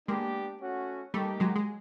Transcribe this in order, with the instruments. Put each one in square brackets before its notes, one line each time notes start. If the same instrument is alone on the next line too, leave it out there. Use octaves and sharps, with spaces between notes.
[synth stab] G#3 A#3 [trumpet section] B3 D4 G4
[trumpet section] A3 C#4 F#4
[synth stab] G3 A3 [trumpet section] A#3 D#4 G4
[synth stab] F#3 G#3
G#3